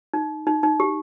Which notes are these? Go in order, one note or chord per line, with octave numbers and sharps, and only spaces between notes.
D#4
D#4
D#4
G4